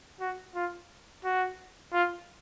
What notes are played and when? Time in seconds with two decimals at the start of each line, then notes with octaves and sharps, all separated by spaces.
0.20 F#4
0.55 F4
1.24 F#4
1.93 F4